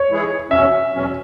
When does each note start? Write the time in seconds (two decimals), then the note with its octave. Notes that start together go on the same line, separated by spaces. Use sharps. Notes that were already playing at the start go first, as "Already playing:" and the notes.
Already playing: C#5
0.10 E3 G#3 E4 G#4
0.51 E2 B2 F#3 C#4 E5
0.93 E2 B2 F#3 C#4